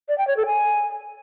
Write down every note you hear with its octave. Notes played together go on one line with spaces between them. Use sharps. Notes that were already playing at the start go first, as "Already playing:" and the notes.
D5
G5
C#5
A4
G#5